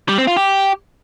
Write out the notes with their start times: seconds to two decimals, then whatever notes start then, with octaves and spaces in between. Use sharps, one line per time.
0.09 G3
0.18 C4
0.27 F4
0.36 G4